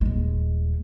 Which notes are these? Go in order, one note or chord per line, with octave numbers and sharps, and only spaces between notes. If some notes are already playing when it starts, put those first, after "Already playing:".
D#1 G#3